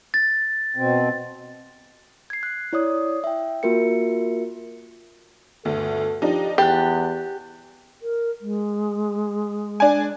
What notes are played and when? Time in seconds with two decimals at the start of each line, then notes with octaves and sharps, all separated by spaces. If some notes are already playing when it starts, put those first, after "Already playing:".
0.14 A6
0.76 B2 C4
2.30 G#6 C7
2.43 F#6
2.73 E4 C#5 D5 D#6
3.24 E5 G5
3.63 A#3 F4 F#4 A#4 E5 C#7
5.65 G1 D2 A4
6.22 F3 D4 D#4 G4
6.58 E2 G4 F#6 A6
8.02 A#4
8.41 G#3
9.80 D4 G#5